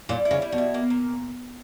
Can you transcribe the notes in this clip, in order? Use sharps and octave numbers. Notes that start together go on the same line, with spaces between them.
A#2 G3
E4
C#3
G3
B2
E4
A#3
A#2